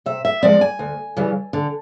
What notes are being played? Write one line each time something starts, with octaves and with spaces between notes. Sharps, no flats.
C3 E5
E5
F3 G#3 C4 D5
G#5
D2
C#3 E3 G3
D3